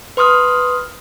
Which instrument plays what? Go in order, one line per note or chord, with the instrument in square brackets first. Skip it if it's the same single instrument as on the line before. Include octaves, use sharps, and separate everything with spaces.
[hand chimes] B4 C6 D#6 F6